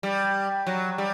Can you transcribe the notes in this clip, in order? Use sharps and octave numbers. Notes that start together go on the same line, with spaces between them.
G3
F#3
G3